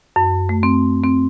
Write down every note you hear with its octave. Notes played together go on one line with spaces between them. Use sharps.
F#2
A3
C4
C4